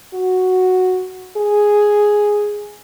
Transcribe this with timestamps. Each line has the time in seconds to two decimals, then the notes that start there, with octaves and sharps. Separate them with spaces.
0.14 F#4
1.37 G#4